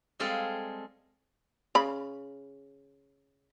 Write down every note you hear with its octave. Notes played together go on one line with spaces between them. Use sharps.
G3 G#3 C4 G#4 A4 F5
C#3 B5